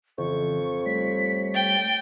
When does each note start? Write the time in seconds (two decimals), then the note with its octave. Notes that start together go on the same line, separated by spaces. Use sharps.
0.18 F2 C#3 E3 C#6
0.86 G3 A3 C#5 B6
1.54 G5 A6